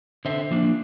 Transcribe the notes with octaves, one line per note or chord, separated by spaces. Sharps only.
D3 C5 E5
F3 A#3 D4